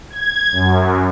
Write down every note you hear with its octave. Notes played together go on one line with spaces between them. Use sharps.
G#6
F#2